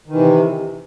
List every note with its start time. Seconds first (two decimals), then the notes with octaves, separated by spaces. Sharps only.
0.07 D#3
0.11 E3
0.14 C3